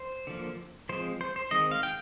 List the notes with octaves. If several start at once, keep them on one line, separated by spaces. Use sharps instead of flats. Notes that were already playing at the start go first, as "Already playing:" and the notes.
Already playing: C5
D3 F3 A#3
F3 G#3 C4 C5
C5
C5
D#3 G#3 C4 D#5
F5
G5